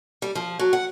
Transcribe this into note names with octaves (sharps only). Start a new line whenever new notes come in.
G3
F3
F#3
F#5